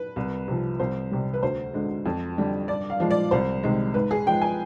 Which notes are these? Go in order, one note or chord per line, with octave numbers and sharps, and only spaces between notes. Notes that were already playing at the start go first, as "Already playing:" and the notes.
Already playing: B4
C2
C3 F3
C2 C5
C3 G3
B4
D2 C5
D3 G#3
F2
D3 G3
G2 D5
F5
F3 G#3
D5
C2 C5
C3 D#3 G#3
G#2 B4
G#4
F3 G#3 G5
G#5